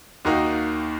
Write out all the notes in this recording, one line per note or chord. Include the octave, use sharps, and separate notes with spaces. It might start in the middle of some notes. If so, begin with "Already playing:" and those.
D#2 D#3 A#3 D#4 F#4